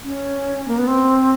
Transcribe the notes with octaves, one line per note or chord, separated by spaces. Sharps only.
C#4
A#3
B3
C4